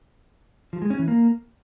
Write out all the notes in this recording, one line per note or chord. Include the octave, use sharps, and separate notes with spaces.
F3
G#3
C#4
E3
A#3